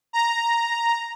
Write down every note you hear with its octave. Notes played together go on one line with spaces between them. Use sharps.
A#5